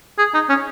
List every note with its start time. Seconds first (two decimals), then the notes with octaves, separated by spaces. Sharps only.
0.18 G#4
0.34 D#4
0.49 C#4